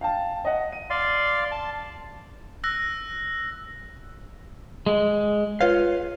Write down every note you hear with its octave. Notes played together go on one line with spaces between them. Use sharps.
F5 G5 A5
D#5 F#5
D#7
D5 F5 C6
A5
E6 F#6 A#6
G#3
F4 B4 C#5 F5